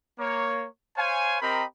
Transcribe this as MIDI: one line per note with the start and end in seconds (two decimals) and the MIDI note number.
0.19 0.66 58
0.19 0.66 73
0.96 1.41 72
0.96 1.41 73
0.96 1.41 77
0.96 1.41 80
1.41 1.63 60
1.41 1.63 67
1.41 1.63 70
1.41 1.63 75
1.41 1.63 82
1.41 1.63 83